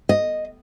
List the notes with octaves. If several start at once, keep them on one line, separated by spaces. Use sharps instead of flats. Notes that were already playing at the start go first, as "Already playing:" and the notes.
D#5